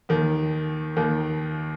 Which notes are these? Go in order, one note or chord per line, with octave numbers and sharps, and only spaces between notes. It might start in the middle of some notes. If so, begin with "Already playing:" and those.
D#2 D#3
D#2 D#3